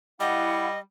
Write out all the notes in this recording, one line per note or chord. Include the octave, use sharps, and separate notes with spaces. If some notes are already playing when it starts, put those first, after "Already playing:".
G3 E4 D#5 F5 F#5